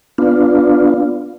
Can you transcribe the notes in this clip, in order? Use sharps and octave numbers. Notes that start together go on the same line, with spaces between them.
B3 D4 F4